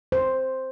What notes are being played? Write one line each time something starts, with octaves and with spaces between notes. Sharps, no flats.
C5